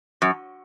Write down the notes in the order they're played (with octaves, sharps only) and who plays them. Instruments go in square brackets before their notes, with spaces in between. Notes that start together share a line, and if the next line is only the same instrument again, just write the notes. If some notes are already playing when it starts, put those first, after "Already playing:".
[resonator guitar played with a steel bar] F#2